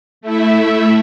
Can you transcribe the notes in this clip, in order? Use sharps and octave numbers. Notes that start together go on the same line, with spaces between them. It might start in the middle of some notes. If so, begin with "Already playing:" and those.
A3 E4 E5